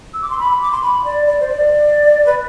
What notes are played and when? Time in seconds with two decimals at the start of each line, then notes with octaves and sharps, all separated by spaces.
0.14 E6
0.22 D6
0.30 C6
0.39 B5
0.61 D6
0.72 C6
0.82 B5
1.05 D5
1.26 D5
1.40 C5
1.48 D5
2.26 B4